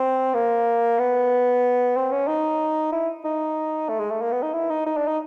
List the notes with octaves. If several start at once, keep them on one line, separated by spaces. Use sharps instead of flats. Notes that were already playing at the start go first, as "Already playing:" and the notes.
Already playing: C4
A#3
B3
C4
C#4
D#4
E4
D#4
A3
G#3
A3
A#3
B3
D#4
E4
D#4
D#4
D4
D#4